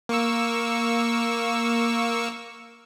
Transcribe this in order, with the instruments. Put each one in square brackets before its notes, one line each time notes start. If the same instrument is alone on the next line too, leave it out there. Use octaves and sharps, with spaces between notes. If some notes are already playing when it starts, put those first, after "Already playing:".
[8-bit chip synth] A#3 C#6 E6